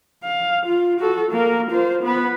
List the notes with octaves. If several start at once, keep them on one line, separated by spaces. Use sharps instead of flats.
F5
F4
F#4 A4
A#3 A#4
F4 C5
B3 B4